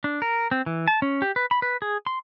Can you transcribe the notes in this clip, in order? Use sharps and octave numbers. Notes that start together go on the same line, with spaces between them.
D4
A#4
C4
E3
A5
C#4
G4
B4
B5
B4
G#4
C6